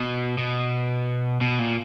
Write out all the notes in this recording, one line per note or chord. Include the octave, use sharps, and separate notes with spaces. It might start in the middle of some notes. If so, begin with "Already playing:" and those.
Already playing: B2
B2
B2
A#2